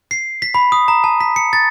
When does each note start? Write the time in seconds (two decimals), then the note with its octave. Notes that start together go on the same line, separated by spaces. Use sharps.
0.11 C7
0.42 B6
0.54 B5
0.72 D#6
0.88 A#5
1.04 A5
1.21 B6
1.36 C#7
1.53 A6